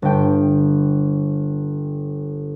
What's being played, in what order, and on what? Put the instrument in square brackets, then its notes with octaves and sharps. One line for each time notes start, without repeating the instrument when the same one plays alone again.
[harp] G1 G5